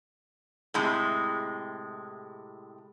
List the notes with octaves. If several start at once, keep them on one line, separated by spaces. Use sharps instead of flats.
A2 C3 G#3